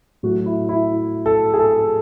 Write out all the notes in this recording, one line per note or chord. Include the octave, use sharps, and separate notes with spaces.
A2 F#3 A3 F#4
E4
E4
A4
G#4
A4